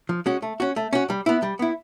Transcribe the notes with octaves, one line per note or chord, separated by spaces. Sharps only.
F3
G#3 C#4 F#4
A3
C#4 F#4
A3
C#4 F#4
G3
B3 E4
G3
B3 E4